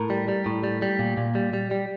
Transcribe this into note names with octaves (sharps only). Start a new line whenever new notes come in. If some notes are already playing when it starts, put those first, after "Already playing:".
Already playing: A2 A#4
G3
G3
A2
G3
G3
A#2
A#2
G3
G3
G3